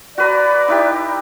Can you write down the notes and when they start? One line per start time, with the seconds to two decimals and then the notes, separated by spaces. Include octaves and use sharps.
0.18 F#4 B4 D5 A#5
0.68 D#4 E4 G4